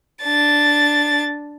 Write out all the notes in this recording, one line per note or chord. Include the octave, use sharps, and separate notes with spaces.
D4 A6